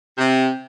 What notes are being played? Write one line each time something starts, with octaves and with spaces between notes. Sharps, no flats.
C3